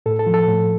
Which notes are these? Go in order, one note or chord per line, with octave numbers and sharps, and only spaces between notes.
A2 A4
A4
F3
A4
A2